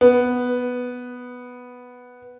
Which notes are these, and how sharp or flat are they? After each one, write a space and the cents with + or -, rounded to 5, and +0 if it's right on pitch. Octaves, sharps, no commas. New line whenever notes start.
B3 +0